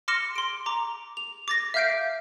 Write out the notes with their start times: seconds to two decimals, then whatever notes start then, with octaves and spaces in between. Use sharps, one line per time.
0.08 C6 D6 F6 A#6 C#7 E7
0.36 C6 D7
0.66 A#5 D6
1.17 F7
1.48 D6 A6 A#6
1.74 E5 F5 F6 G6 C7 D7